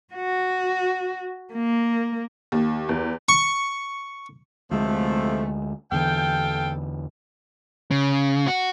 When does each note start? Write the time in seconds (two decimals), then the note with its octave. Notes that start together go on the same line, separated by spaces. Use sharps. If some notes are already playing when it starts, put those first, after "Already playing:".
0.14 F#4
1.54 A#3
2.52 D#2
2.89 E2
3.29 C#6
4.71 D2 C3 F3 G#3 A3
5.92 E2 D3 E3 A4 F5 G5
7.91 C#3
8.47 F#4